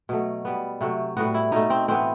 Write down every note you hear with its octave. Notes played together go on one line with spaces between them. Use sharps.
B2 F#3 A3
B2 G3 B3
C3 F#3 A3
A2 G3 B3 F#4
E4
B2 A3 D#4
C4
A2 E3 B3 C4